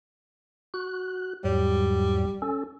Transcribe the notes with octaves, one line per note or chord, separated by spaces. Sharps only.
F#4 F#6
E2 G#2 F#3 G3
C#4 A4